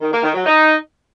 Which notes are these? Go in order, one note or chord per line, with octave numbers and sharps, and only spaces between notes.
D#3
A#3
D#3
F#3
D#4